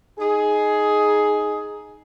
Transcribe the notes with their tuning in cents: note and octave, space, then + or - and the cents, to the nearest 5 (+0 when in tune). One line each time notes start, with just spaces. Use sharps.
D#4 +0 G#4 +10